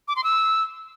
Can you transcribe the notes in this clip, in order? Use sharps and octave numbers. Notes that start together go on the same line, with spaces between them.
D6
C6
E6